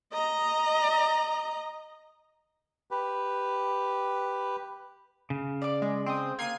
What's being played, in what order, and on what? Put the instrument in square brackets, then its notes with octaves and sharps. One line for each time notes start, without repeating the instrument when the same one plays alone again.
[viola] D#5 A#5
[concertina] G4 B4
[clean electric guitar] C#3
[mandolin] D5 D6
[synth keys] G#3
C4 G5 D#6
[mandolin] A#3 [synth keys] G#6 C7 D#7